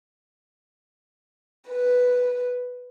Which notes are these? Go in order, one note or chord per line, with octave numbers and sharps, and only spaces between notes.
B4